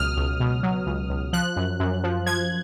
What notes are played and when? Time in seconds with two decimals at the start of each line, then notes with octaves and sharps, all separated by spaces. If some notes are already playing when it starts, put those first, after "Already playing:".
Already playing: C#2 B2 F#3 D#6 F6
0.17 C#2
0.40 B2
0.63 F#3
0.86 C#2
1.10 C#2
1.33 F3 F#6
1.56 F#2
1.80 F#2
2.03 F3
2.26 F3 G#6